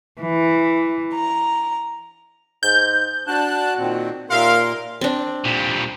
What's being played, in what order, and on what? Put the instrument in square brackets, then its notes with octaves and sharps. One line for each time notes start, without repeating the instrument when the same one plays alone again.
[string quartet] E3
A#5
[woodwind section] G#2 [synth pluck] G6
[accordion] D4 A5 F#6 [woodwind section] F#4
[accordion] A#2 D#3 C4
[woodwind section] D#2 [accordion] A#2 A#4 C6 [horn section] E5 F5
[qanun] C4 D4
[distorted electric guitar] A#2 G3